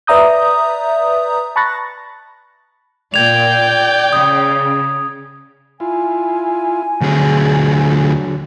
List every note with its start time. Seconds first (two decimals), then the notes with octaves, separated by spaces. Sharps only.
0.07 B4 D5 E5 A#5 D#6 G6
1.56 A5 B5 C#6 F#6 A6 A#6
3.14 A#2 D5 G5 G#6 F7
4.13 C#3 D#6
5.80 E4 F4 G#5
7.01 D2 D3 F#3 G#4